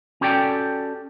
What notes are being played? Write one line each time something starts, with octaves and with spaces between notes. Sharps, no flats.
C#4 F#4 G4 A4 D5 G5